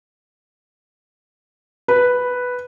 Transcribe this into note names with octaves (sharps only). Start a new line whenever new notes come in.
B4